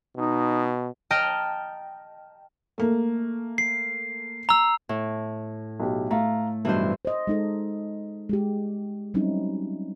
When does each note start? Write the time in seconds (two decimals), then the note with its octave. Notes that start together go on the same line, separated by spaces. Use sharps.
0.17 B2 D#4
1.11 D#5 G5 A5 A#5 F6
2.78 A3 A#3
3.58 C7
4.49 A#5 E6
4.89 A2
5.80 B1 G4
6.11 A3 F5 A#5
6.65 B1 G2 E3 C5
7.05 C5 D#5
7.27 G#3 D#4 A4
8.29 G#3 G4
9.14 F#3 G3 C4 C#4 D#4 E4